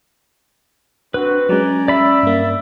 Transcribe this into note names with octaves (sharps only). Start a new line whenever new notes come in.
C4 D4 F#4 B4
F#3 G#3 C#4 D5 G#5 A#5
D5 E5 B5
G2 A#3